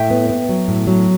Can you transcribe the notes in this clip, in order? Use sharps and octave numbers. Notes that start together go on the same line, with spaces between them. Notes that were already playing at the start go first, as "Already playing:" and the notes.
Already playing: A2 E5 G5
B3
B3
F#3
A2
F#3